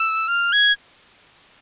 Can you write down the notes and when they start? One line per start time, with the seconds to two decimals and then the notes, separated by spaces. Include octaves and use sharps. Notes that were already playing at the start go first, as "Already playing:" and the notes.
Already playing: E6
0.28 F6
0.53 G#6